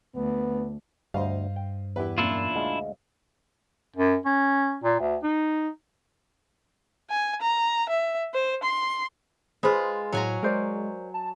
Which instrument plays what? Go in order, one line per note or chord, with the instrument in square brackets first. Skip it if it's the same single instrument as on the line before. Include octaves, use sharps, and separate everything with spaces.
[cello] D2 [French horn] B3
[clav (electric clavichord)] D2 [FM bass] G2 [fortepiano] C5 D#5 F5
[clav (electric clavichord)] G5
[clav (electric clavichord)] E2 [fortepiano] E4 G4 B4
[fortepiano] F#2 A#2 A#3 [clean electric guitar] D4 E4 F4
[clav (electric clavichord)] D2 G#3 F5
[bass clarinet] F#2
C#4
A#2
D2
D#4
[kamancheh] G#5
A#5
E5
C5
C6
[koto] G#3 F4 [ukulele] G#4 B4 C5
[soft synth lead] A2 [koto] F#3 G#5 A#5
[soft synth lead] G#3 [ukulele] A#4 C5 D5
[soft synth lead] A5